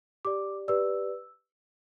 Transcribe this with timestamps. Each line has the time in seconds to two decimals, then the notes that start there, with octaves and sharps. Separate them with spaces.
0.25 G4 D5 D6
0.68 G4 B4 D5 E6